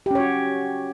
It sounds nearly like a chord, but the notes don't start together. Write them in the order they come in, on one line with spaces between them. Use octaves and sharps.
G4 C#4 C#5 F#4